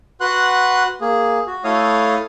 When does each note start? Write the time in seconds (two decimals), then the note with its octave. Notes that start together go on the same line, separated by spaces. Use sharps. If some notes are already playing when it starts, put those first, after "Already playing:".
0.21 F#4 B4 F#5 C6 F#6
1.01 A#3 G#4
1.47 F#4
1.64 A3 E4 A4 C#5 F5 D#6